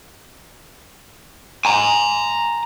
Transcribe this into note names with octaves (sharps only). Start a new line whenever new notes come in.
G#5 A#5